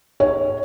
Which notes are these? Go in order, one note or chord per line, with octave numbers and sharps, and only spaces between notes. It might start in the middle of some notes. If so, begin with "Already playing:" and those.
C#5